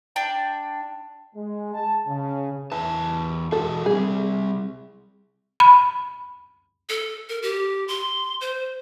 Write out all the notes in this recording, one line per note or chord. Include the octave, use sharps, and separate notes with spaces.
D4 G5 A5
G#3
A5
C#3
E2 E3 A5
E3 F#4 G#4 A4
G3 C4 G#4
B5
A4
A#4
G4
C6
C5